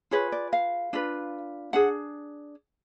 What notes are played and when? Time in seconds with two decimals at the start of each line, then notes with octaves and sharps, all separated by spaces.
0.11 F4 G#4 B4 C#5
0.32 D5
0.53 F5
0.93 D4 F4 B4
1.73 D4 G#4 F#5